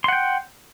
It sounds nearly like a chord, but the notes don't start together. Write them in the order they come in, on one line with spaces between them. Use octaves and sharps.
C6 F#5 G5